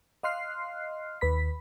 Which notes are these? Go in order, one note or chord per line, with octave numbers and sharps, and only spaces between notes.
D#5 F5 C6 F6 F#6 C7
D#2 B4 B5 B6